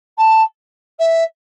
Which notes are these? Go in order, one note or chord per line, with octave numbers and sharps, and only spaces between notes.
A5
E5